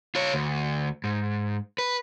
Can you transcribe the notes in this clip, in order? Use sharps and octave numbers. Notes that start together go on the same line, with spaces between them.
F4 C#5
D2
G#2
B4